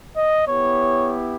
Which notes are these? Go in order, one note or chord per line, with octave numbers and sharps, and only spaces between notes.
D#5
B3 E4 G4 C#5